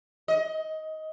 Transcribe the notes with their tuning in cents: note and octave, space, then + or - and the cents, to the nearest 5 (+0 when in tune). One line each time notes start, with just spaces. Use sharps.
D#5 +15